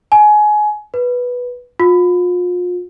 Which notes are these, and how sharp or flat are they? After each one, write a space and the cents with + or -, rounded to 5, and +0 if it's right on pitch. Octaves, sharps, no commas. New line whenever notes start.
G#5 +25
B4 -5
F4 +35